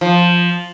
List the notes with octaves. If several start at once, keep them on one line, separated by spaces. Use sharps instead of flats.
F3